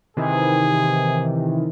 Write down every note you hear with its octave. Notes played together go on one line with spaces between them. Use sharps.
C3 D#3 E3 G#4